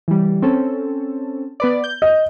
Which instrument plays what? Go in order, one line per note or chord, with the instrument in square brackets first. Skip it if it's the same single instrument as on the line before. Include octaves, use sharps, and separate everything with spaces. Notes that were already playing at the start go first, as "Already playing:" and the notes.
[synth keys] E3 G3
C4 C#4 A4
B3 B4 D5
G6
[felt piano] D#5